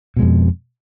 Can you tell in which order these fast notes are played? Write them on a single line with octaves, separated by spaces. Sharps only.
B2 G#3 F2